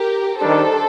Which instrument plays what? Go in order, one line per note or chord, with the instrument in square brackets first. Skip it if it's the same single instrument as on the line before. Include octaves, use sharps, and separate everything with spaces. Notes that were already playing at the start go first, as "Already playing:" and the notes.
Already playing: [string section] G4 A#4
[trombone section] D#3 G3 D4 [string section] A4 C5